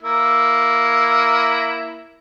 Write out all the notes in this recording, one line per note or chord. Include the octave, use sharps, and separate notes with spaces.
A#3 E4